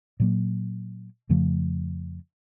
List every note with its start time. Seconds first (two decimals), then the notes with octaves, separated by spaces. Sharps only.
0.20 A#2 F#3 A#3
1.29 F2 C#3 F3 A3